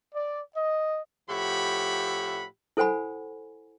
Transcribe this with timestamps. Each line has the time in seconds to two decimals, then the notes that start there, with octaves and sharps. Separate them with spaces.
0.14 D5
0.55 D#5
1.30 A2 F3 G4 E5 F#5 B5
2.77 E4 A4 C5 F#5 G#5 B5